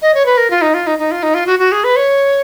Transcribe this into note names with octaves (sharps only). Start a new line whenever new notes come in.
D#5
C#5
B4
A#4
F4
D#4
F4
D#4
D#4
F4
D#4
F4
F#4
F#4
G#4
B4
C#5